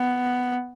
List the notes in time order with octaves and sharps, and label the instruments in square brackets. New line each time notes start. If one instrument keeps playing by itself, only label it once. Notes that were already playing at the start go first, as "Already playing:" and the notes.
Already playing: [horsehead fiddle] B3